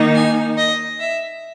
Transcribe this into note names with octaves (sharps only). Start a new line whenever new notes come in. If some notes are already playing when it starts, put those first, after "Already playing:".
Already playing: D#3 A#3 D#4
G#5
D#5
E5